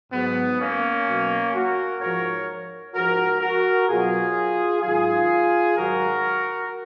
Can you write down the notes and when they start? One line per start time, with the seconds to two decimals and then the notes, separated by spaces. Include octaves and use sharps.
0.12 G#2 F#3 B3
0.60 A#3 C#4
1.07 B2 F#3
1.54 F#4 A#4
2.00 G#2 F3 A#4 C#5
2.94 G#2 F3 F#4 A#4
3.41 F#4 A#4
3.89 B2 F#3 F4 G#4
4.83 G#2 D#3 F#3 F4 G#4
5.76 G#2 D#3 F#3 F#4 A#4